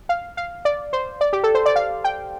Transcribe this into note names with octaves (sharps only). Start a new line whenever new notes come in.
F5
F5
D5
C5
D5
G4
A4
C5
D5
F5
G5